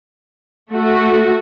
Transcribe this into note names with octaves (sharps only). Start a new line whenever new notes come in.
A3 F#4